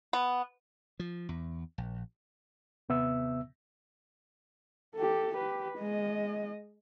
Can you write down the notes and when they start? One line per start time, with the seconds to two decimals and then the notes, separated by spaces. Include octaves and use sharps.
0.13 B3
1.00 F3
1.29 E2
1.78 A#1
2.89 D#2 C3 B3 E5 E6
4.96 G4 A4
5.35 G4 B4
5.78 G#3 D#5